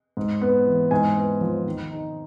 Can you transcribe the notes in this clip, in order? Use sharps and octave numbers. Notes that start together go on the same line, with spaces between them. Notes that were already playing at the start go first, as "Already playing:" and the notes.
G#2
B3
E3
G#2 G#5
B3
F3
D#3
D#4